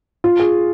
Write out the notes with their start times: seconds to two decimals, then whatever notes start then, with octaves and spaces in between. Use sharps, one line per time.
0.24 F4
0.39 G#4